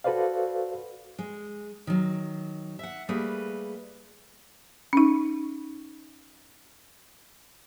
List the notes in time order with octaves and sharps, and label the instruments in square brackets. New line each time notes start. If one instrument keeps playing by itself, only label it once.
[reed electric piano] F#4 A4 B4 C5 D5 F5
[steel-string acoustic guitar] G#3
D#3 F#3
E5 F#5
G3 A3 A#3 G#4 B4
[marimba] C#4 D#4